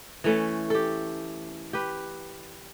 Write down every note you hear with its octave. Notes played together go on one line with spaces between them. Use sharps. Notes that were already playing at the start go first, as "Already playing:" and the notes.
E3 A3 C#4
G4 A4
G4 B4